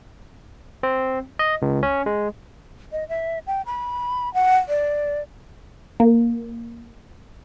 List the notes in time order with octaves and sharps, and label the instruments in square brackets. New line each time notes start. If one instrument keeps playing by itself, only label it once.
[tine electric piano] C4
D#5
C#2
C#4
G#3
[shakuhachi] D#5
E5
G5
B5
F#5
D5
[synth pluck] A#3